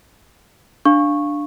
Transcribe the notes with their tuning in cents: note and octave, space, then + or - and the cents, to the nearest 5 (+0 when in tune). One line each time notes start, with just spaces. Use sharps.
D4 +5 F5 +0 C#6 -10